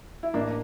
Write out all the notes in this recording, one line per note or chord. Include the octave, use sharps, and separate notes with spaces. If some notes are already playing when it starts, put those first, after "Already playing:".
E4
A1 A#3 D4